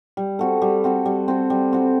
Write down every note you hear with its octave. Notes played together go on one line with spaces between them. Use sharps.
G3
C4 F#4 A4
G3
C4 F#4 A4
G3
C4 F#4 A4
G3
C4 F#4 A4